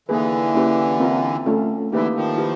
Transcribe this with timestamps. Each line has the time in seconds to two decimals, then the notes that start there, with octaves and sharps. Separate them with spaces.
0.08 D3 E3 A#3 D#4 G#4 B4
0.54 A#3 C#4 E4 G4 B4
1.00 C4 F4 A#4
1.46 A3 C#4 F4 A4
1.91 D3 E3 A#3 D#4 G4 B4 E5
2.14 D#3 F3
2.37 E4 G4 B4